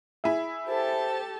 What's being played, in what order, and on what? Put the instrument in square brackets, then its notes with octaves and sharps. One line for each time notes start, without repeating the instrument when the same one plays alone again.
[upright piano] E4 G#4 [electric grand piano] E5
[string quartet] G4 A4 A5 [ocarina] C5